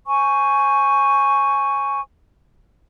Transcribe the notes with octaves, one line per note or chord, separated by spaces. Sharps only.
C5 G#5 C#6